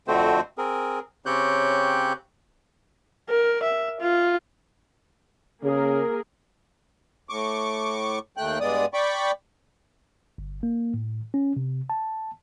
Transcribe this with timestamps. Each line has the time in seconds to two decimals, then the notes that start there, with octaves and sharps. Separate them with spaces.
0.08 F2 D3 A3 C4 F#4 C5
0.58 C4 G#4 A#4
1.26 C#3 C4 G4 C#5 F#6 G6
3.29 A#4
3.63 E5
4.00 F4
5.63 C#3 A#3 G#4 A#4
7.30 A2 C#6 D6
8.37 D#2 A3 G5 F#6
8.61 G2 G#3 B3 D5 D#6
8.94 D5 G5 B5 C#6 D6
10.38 G1
10.63 A#3
10.94 A2
11.34 C#4
11.56 C3
11.90 A5